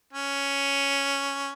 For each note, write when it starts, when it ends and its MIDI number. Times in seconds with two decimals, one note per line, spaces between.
0.13 1.51 61